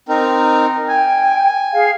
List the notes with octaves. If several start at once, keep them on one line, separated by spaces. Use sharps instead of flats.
C4 D#4 A#4
G5 G#5
G#4 F5